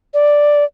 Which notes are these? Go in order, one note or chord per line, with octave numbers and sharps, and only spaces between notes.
D5